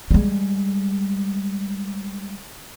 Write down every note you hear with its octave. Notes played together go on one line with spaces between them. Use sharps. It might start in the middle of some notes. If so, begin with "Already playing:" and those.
G3 G#3